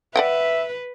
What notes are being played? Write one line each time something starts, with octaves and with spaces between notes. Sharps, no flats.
B4 D5 E5 F#5 G5